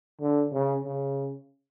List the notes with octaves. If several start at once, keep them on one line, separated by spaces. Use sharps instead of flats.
D3
C#3
C#3